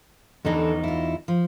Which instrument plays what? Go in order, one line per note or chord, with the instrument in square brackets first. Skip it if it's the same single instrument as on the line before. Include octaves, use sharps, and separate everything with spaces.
[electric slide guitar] E2 D#4 [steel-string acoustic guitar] E3 D4 A4
[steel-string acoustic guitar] E4 F4
F3